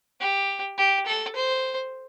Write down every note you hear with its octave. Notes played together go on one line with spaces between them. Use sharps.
G4
G4
A4
C5